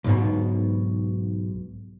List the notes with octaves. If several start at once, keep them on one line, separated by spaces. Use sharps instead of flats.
B1 G#2 B2